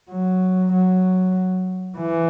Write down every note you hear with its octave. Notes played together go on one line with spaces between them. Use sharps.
F#3
F#3
E3